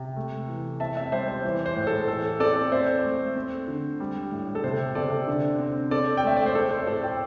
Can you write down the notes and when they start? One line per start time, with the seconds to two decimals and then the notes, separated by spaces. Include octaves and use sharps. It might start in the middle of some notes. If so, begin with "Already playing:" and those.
Already playing: C3
0.16 A3
0.48 E3
0.80 C4 E5 A5
0.96 E5 A5
1.12 G3 C5 E5
1.28 C5
1.44 E3
1.66 C5
1.76 A2
1.87 A4
2.08 E3 A4
2.40 C4 A4 D5
2.72 C4 C5 E5
3.04 A3
3.36 C4
3.68 D3
4.00 G3
4.32 A2
4.55 A4
4.64 C3 C5
4.95 C3 A4 D5
5.27 D3
5.59 C4
5.91 C4 A4 D5
6.17 G5
6.24 A3 E5
6.37 D5
6.46 C5
6.55 C4 A4
6.71 C5
6.87 A2 A4 D5
7.03 D5 G5